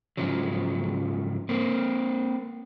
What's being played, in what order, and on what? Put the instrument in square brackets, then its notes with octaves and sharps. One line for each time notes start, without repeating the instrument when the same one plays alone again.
[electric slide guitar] G#2 C#3 F3 F#3
A#3 C4